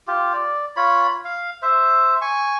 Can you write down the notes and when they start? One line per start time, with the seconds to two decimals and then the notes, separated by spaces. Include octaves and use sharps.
0.08 F4 G4
0.33 D5
0.76 F4 C#5 B5
1.25 F5
1.62 C5 E5
2.21 G#5 C#6